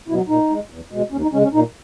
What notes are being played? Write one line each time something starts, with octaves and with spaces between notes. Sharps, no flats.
B2 F#3 E4
A#2 D#4
G#3
E2
B2 G#3
D#2 C#4
D#4
C#3 G#3 C#4
C#4
A#2 D#4